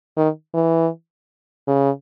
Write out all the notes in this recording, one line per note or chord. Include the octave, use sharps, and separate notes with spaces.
D#3
E3
C#3